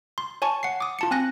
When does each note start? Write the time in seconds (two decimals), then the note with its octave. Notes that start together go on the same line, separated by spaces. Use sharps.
0.18 C6
0.42 C#5 G#5 A5 C#6
0.63 F#5 C7
0.80 D6 D#6
0.99 F4 A5 C#7
1.11 C4 G#5 F#6 A#6